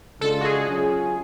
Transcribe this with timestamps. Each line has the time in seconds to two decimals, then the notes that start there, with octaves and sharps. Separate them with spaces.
0.21 C#3 G#3 D4 F4 A4
0.41 F#4
0.45 G#4
0.68 F#3 C#4 F4 G#4